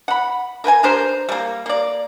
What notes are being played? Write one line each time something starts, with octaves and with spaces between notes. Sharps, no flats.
F#5 B5
A#4 B4 G5 G#5
D4 G4 A#4 C5
G3 A#3
A#3 D5